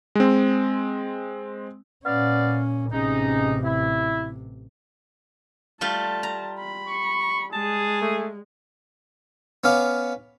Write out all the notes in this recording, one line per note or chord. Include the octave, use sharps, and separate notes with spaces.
G#3 C4
A#2 B3 C#4 D5 F5
A1 C3 G#3 C#4 D#4
E4
G3 A3 F4 A5
A#5
B5
C#6
G#3 G#4 A5
A3
B3 C#4 F5 D6